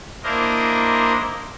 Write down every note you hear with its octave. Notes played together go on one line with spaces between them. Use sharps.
A#3 D4 E4 A#4 C5 D#5